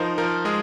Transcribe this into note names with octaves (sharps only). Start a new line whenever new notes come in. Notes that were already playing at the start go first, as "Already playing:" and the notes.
Already playing: F3 D#4 A#4 C5
F3 A#4
G#3 G#4